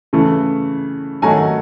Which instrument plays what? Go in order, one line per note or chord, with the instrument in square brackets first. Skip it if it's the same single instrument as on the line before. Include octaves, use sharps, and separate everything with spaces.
[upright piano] C#3 E3 A3
D#3 F#3 A3 G#5 A#5